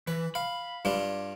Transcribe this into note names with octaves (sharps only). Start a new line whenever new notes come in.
E3 B4
F5 B5
G2 D4 F4